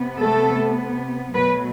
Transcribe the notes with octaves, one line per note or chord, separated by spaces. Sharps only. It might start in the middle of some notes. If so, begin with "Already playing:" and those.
Already playing: C3 B3
A3 A4
B2 F#3 A3 B3 B4